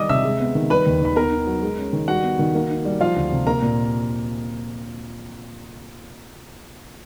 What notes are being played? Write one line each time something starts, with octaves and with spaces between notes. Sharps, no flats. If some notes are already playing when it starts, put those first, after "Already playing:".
Already playing: D#3 G3 D5 D#5 D6 D#6
C3 E5 E6
G#3
B3
D#3
G3 B4 B5
D#2
D#3 B5
B3 A#4 A#5
D#4
F#3
G#3
C#4
D#3
G3 F#4 F#5
B3
D#3
A#3
D#4
G3
F3 F4 F5
D2
C3
A#3 A#4 A#5
A#2